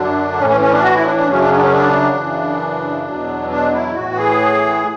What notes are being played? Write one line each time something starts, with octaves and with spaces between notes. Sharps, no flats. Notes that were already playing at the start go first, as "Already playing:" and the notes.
Already playing: F#2 D3 F#3 D4
A2 E3 C#4
C#4
C#4
D4
F#4
E4
D4
D4
F#2 C#3 F#3 C#4
D4
C#4
D4
C#4
D4
F#2 C#3 E3
E2 B2 F#3
D4
E4
A2 E3 F#4
G#4